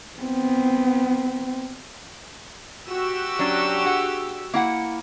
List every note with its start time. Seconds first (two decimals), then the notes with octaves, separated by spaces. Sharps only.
0.20 B3 C4
2.88 F#4 G4 E6
3.39 F#3 C#4 D4
3.86 G#4 F#5
4.54 A#3 E4 F#5